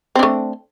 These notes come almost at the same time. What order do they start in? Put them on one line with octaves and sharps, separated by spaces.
C4 D4 A3